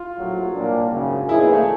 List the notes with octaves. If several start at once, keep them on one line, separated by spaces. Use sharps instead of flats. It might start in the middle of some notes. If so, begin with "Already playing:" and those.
Already playing: F4
A#1 A2 F#3
C2 A#2 G3 A#3 D4
G#1 F#2 C#3
A#2 F3 A#3 D#4 E4 G#4
B3
A3